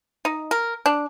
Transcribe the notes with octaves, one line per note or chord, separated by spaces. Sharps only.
D#4
A#4
D4